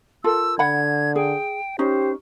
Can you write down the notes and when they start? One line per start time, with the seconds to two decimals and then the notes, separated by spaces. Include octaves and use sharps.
0.24 F4 A4 A#4 E6
0.59 D3 F#5 B5 G#6
1.15 G#4 G5
1.79 C#4 D#4 G4 C5